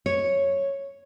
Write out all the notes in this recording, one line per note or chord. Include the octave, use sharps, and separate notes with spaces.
C#5